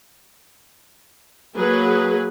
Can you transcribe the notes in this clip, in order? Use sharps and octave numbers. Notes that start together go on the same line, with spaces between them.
F#3 A#3 G#4 B4